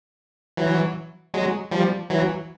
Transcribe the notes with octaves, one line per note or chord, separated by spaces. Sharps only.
E3 F#3
F#3 G#3
F3 G3
E3 F#3